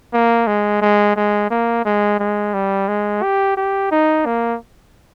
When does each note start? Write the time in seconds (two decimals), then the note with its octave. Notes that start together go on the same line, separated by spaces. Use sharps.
0.13 A#3
0.47 G#3
0.81 G#3
1.16 G#3
1.50 A#3
1.85 G#3
2.19 G#3
2.54 G3
2.88 G#3
3.22 G4
3.57 G4
3.91 D#4
4.25 A#3